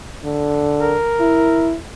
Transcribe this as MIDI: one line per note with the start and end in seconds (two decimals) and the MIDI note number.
0.24 0.96 50
0.80 1.72 70
1.20 1.74 64